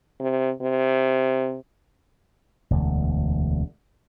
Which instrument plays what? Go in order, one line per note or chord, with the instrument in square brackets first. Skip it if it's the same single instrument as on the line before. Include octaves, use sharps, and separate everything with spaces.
[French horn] C3
C3
[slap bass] E1 D2